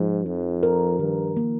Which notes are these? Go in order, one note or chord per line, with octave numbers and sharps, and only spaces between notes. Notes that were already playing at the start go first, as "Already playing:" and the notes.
Already playing: G#2 F3
F2 D#4
A#4
G2 D#3
A#3